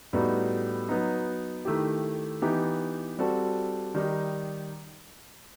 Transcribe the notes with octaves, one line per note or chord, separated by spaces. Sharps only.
A2 G3 B3 D#4 F#4
F#3 B3 D#4
D#3 A3 E4 G4
E3 B3 D#4 G4
G3 C4 F#4 A4
D#3 G3 D#4 G4